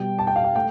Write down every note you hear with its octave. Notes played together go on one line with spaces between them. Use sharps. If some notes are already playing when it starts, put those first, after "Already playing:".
Already playing: B2 G3 G5
A5
G5
F5
G5
A3 G5